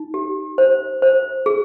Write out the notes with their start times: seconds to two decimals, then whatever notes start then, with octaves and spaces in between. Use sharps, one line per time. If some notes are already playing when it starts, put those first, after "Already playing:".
Already playing: D#4
0.14 G4
0.58 C5
1.02 C5
1.46 G#4